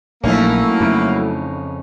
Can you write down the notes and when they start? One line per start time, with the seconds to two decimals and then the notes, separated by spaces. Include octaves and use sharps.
0.24 A#1 F#3 A3 A#3 C#4 D#4 E4
0.81 F2 C#3